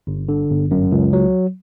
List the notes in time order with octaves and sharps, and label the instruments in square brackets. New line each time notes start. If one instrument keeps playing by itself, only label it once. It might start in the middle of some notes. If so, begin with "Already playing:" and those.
[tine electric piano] G1
D3
G1
F#2
C#2
F#3